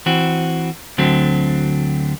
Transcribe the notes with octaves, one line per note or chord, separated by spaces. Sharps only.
E3 C4 F#4
D2 D3 F#3 A3 C4